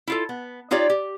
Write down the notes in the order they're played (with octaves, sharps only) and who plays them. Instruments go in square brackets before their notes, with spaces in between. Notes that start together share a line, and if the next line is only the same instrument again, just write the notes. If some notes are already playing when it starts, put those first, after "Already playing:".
[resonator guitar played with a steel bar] E4 F4 A4
B3
D#4 F4 G4 C#5 D5
G4